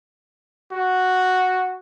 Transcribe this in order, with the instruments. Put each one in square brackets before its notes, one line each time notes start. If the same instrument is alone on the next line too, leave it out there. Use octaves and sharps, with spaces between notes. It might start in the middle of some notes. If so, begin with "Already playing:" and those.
[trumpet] F#4